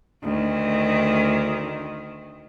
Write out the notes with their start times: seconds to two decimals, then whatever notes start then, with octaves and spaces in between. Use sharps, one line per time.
0.24 D2 D#3